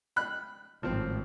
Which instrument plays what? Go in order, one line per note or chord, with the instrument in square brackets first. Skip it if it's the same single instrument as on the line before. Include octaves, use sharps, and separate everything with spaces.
[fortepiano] B5 F#6
[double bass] G#1 A2 [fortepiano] F3 C4